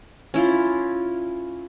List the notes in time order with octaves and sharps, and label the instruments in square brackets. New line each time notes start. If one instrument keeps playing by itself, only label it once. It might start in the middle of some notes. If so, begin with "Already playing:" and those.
[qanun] C#4 E4 F4